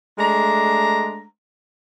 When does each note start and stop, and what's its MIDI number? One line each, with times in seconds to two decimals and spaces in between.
0.19 1.25 56
0.19 1.25 57
0.19 1.25 62
0.19 1.25 82